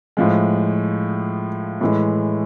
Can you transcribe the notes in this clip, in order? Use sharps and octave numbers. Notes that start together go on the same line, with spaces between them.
A2 F3 G#3
A2 E3 G#3